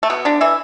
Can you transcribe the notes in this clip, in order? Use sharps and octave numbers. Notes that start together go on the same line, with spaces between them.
A3
B2 B3
D3 D4
E3 E4